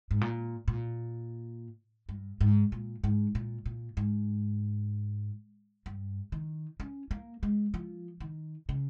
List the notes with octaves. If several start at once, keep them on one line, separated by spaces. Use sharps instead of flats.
G#2
A#2
A#2
G2
G#2
A#2
G#2
A#2
A#2
G#2
G2
D#3
C#4
A#3
G#3
F3
D#3
C#3